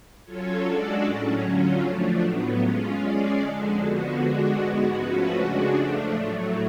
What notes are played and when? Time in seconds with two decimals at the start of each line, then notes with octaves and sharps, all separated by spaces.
0.25 F#3 C#4 F4 A4 C#5
0.63 G#3 D4 F#4 A4 D5
1.03 A2 F#3 C#4
1.42 D3 F#3 C#4 F4
1.81 F3 A3 D4
2.20 A2 F#3 B3
2.60 G#3 C#4 F4
2.99 G#3 C#4 G#4 D5
3.39 F2 D3 G#3 D4
3.77 D3 F3 B3 F#4
4.16 D3 G#3 D4 F#4
4.56 G#2 G#3 B3 F#4
4.95 F3 A3 C#4 F#4 B4
5.33 C#3 G#3 D4 F#4
5.73 F3 A3 D4
6.12 A2 F#3 A3